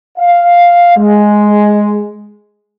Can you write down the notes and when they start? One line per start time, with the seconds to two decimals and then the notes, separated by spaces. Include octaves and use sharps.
0.18 F5
0.97 G#3